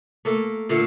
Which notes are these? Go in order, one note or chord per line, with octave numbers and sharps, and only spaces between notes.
A3 A#3 A4
A#2 D3 A3 F5